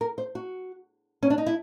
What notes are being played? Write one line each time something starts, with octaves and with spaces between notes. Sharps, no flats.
A#4
C5
F#4
C#4
D4
D#4
E4